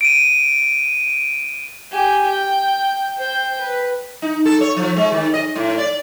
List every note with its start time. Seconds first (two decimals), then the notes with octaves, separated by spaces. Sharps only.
0.01 D7 D#7
1.92 G4 G#5
2.31 G5
3.17 C5 G5
3.61 B4
4.22 D#4
4.45 A4
4.61 C#5
4.77 F3
4.96 G#3
5.12 D#3
5.34 D#5
5.55 A2
5.78 D5